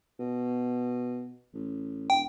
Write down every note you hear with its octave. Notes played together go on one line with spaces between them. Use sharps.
B2
A1
E1 G5